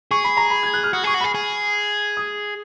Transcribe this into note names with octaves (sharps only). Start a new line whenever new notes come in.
G#4 C#6
B5
A#5
B5
G#6
F#6
F6
F#4 D#6
G#4 C#6
F#4
G#4 B5
G#4
D#6